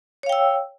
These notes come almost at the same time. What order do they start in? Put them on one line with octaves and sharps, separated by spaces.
C#5 F5 G5 E6